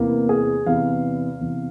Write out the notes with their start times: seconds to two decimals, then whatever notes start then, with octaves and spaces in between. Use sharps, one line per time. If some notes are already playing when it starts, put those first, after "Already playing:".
Already playing: E2 C3 E3 A#3
0.29 G#4
0.66 E2 C3 E3 F5
1.41 E2 C3 E3